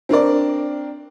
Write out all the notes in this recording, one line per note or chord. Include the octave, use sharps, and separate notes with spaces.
C4 D4 A#4 D5